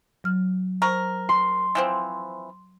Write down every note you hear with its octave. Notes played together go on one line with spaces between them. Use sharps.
F#3 F6
A#4 C5 C#6
C6
E3 F3 C4